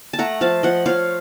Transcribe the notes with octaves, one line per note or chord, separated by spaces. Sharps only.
A5
A3 F#5 A#5
F3 F5 A5
F3 D#5 F#5
F3 C#5 F5